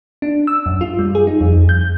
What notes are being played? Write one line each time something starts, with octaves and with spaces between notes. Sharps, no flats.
D4
E6
F#2
F4
G3
G#4
D#4
F2
G6